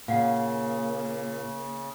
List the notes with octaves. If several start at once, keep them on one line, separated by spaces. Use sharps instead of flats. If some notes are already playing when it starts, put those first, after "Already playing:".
A#2 C#3 A#3 F5 F#5